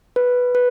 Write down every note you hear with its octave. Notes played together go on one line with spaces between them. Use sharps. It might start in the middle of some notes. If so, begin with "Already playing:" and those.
B4
B4